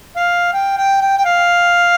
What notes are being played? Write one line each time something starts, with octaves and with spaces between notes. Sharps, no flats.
F5
G5
G5
G5
G5
F5